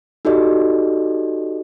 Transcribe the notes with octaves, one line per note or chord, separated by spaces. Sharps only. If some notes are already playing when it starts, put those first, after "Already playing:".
D#4 F#4 G4 A4 D5 D#5